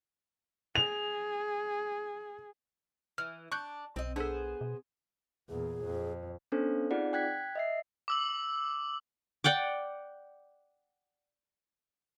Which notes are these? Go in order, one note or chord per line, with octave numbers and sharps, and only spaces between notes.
G#4 F7
E3 F6
D4 C#6 F#6 G6
B1 C4 D#5
B3 D4 G#4 A4 C5
B2
E2 A#2 G#4
F2
B3 C#4 D4 A4 C5
C4 D#4 F4 G#4 D5 F#5
G5 F#6 G#6 B6
D#5 E5 C7
D6 E6 F#7
D5 F#5 G5 D6